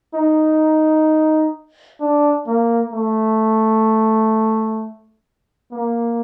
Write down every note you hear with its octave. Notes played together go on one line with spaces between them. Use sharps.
D#4
D4
A#3
A3
A#3